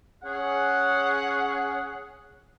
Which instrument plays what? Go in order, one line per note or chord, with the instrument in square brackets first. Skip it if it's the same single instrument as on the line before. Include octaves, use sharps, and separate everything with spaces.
[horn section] C#4 G#4 F#5